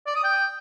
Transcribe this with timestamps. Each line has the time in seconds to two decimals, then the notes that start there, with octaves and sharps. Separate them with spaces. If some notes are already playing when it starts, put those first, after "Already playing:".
0.07 D5
0.15 D#6
0.24 G5